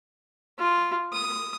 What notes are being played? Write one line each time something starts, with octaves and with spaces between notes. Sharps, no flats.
F4
D#6